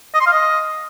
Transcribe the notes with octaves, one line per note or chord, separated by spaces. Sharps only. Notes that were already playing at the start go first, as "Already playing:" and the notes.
D#5
C6
F5
D#5